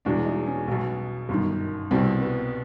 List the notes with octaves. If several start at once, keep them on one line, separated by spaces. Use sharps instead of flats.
E1 E2 B2 D4
D#4
C#4
B1 B2
G1 F#2 D#3
C2 B2 C4
B3